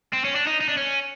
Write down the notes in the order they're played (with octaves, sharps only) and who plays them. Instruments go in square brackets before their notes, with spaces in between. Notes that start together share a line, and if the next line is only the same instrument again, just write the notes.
[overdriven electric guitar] C4
C#4
D4
D#4
D#4
D4
C#4